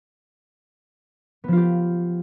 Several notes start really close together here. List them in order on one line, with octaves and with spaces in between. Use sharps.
B3 F3 F4 G4